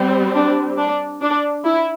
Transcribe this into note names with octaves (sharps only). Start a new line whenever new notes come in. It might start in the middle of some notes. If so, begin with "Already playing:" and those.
Already playing: G3 C4
D4
D4
D4
E4